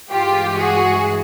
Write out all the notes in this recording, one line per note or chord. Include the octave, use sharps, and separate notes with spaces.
G2 E3 G#3 F4 G4
F#4 G#4